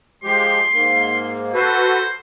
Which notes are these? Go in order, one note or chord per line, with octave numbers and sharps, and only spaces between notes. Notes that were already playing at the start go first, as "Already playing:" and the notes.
F3 G#3 G4 C6
G#2 A#3
F#4 A4 B4 C5